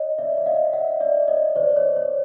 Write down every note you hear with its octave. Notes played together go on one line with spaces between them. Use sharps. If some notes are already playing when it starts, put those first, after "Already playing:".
Already playing: C#5 D#5
D5 E5
E5
D#5 F5
E5 F#5
D5 E5
C#5 D#5
C5 D5
C#5
C#5